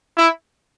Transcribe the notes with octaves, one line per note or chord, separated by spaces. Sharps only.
E4